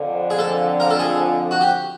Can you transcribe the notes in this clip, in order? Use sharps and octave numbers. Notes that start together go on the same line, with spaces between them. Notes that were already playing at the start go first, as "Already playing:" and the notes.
Already playing: F2 D3 F3
G#4
A4
A#4
A4
G#4
F#4
G4